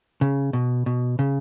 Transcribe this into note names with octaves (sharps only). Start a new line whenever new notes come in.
C#3
B2
B2
C#3